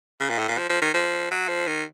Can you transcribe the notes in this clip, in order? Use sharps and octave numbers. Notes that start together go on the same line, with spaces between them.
C#3
A#2
A2
A#2
F3
F3
D#3
F3
F#3
F3
D#3